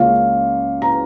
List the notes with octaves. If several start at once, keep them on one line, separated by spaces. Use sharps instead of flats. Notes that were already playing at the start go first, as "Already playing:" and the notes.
Already playing: C#2 C#3 A#3 C#4 F4 F5
A#5